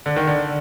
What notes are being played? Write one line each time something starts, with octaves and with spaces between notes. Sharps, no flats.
D3
D#3
D3